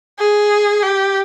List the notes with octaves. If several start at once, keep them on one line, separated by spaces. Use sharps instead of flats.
G#4
G4